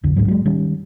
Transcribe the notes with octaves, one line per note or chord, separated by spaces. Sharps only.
B1 F2 D3
A1 D2 G#2 F#3
F#3 G#3
D#3 G3 C#4